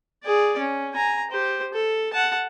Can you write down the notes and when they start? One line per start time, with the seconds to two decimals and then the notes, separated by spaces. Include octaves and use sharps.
0.24 G#4 D5
0.58 C#4
0.94 G#5 A#5
1.31 G4 C5
1.73 A4
2.13 F#5 A5